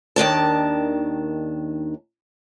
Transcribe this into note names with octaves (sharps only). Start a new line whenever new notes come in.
D#2 D#3 D4 A5